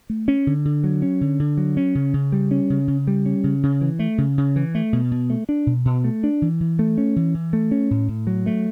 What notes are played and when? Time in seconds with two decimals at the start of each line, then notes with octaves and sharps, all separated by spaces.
0.10 A3
0.28 C#4
0.47 D3
0.65 D3
0.84 F#3
1.02 C#4
1.21 D3
1.40 D3
1.58 F#3
1.77 C#4
1.95 C#3
2.14 C#3
2.32 G3
2.51 C#4
2.70 C#3
2.88 C#3
3.07 G3
3.26 C#4
3.44 C#3
3.63 C#3
3.81 E3
3.99 A3
4.18 C#3
4.38 C#3
4.56 E3
4.75 A3
4.93 B2
5.11 B2
5.30 A3
5.49 D4
5.67 B2
5.85 B2
6.04 A3
6.24 D4
6.42 E3
6.60 E3
6.79 A3
6.98 C#4
7.16 E3
7.35 E3
7.53 A3
7.71 C#4
7.91 A2
8.08 A2
8.27 F#3
8.46 A3